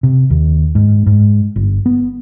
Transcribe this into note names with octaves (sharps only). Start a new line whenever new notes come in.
C3
D#2
G#2
G#2
G1
B3